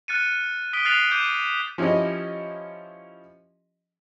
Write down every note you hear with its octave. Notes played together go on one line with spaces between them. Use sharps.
F6 F#6 A6 C#7 D#7
D#6 B6 D7 G7
F6 F#6 A6 C7 F7 F#7
D6 G6 D#7
F3 C#4 E4 G4 D#5